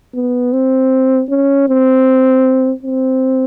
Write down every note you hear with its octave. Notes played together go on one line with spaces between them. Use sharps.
B3
C4
C#4
C4
C4